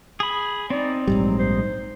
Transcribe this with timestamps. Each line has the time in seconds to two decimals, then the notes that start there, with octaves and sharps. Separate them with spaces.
0.20 G#4 B5
0.70 C4 D#4 D5
1.07 A#1 G#2 F#3 G3
1.39 C5